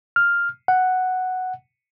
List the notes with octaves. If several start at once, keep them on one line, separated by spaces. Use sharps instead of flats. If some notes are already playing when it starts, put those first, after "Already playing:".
F6
F#5